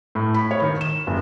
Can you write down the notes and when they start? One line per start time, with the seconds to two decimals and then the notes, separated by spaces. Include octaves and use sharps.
0.15 A2
0.34 B5
0.51 C#5
0.62 D#3
0.81 E7
1.07 F#1